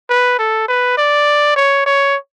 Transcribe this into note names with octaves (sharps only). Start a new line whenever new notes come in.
B4
A4
B4
D5
C#5
C#5